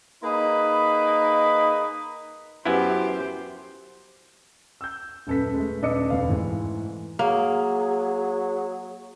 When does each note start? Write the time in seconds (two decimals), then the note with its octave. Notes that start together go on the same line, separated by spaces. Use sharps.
0.24 A#3 D#4 G#4 B4 B5
2.65 F#2 B3 E4 G4 C5
4.81 E6 G6
5.27 D#1 F#2 A4 B4 B6
5.54 G#3 A3
5.82 D#1 D4 B4 D#5 E6 C#7
6.10 F1 B2 F5
6.28 G#2 E3 A3
7.19 F#3 A#3 G#4